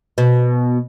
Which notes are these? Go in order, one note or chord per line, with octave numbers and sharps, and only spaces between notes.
B2